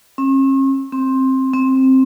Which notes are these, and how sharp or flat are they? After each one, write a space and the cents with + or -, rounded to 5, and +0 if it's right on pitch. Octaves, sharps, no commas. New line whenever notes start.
C#4 -45
C4 +15
C4 +10